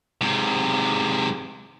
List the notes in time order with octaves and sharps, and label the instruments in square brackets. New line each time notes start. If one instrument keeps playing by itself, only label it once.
[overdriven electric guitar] G#2 C3